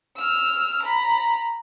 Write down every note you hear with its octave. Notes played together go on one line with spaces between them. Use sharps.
E6 F6
A#5 B5